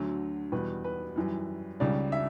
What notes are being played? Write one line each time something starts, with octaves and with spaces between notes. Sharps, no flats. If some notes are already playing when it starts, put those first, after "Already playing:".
Already playing: D2 D3 F#3
E2 B2 G3 B4
B4
F#2 E3 G3
C#2 C#3 G3 D5
E5